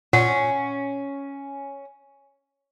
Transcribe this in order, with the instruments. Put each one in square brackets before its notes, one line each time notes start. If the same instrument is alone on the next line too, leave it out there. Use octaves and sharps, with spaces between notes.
[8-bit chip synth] A#2 [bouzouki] C#4 [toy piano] F#5